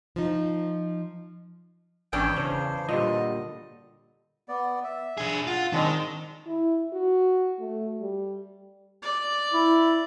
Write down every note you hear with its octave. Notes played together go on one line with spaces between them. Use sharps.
F3 D#4
G#1 E2 C#4 D4 G5
C#3 C5
A#2 D3 G3 D#5
B3 D5
E5
D4 G#4
F4 F#5
D#3 G#3 C4 D4
E4
F#4
A3
G3
D5
E4